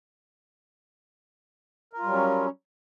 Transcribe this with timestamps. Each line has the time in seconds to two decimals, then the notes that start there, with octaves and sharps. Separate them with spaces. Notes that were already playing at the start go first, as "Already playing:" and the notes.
1.93 A#4
1.98 F4
2.03 G3
2.08 F#3
2.13 C#4